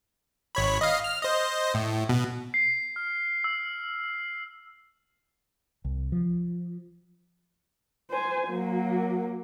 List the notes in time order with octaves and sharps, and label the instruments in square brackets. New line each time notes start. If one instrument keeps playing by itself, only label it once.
[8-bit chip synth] G#1 C#5 B5
D#5 F5
F6
C5 D#5
A2
B2
[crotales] C7
F6
E6
[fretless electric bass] C2
F3
[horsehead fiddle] C5 G#5
F#3 A#3